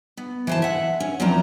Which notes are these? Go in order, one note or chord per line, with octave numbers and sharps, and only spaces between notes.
B3
E3 C5 A5
E5 F#5
C#4
E2 F3 F#3 C4 D5 A#5